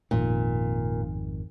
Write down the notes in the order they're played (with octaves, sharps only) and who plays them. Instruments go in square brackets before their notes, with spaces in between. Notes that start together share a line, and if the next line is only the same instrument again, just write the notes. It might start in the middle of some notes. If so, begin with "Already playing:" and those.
[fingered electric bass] G#1 F2 D#3 [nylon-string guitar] A#2